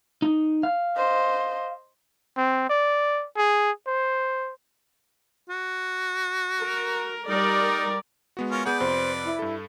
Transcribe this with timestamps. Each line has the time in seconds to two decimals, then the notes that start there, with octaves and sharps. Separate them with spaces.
0.22 D#4
0.63 F5
0.97 C5 D#5
2.37 C4
2.69 D5
3.37 G#4
3.87 C5
5.49 F#4
6.61 A#4
7.29 G3 D#4 A#4 D5
8.37 G#3 B3 F#4
8.51 C#4 F4 A#4 C#6
8.66 B3 G#4 B4 D5 F#5 G6
8.80 F2 C3 C5
9.25 E4
9.39 G2 A4